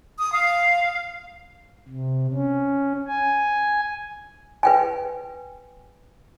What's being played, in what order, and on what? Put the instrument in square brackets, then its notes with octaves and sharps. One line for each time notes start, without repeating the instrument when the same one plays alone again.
[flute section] D#6
F5
[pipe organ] C3
C#4
G#5
[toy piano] B4 G5 G#5